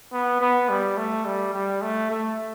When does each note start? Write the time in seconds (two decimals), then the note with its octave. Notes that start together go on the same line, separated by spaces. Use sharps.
0.13 B3
0.41 B3
0.69 G3
0.97 A3
1.25 G3
1.54 G3
1.82 A3
2.10 A3